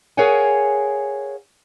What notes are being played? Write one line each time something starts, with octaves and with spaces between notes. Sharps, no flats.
G#4 A#4 C#5 F5 F#5 G#5